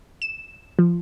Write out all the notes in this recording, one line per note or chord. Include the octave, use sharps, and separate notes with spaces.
E7
F3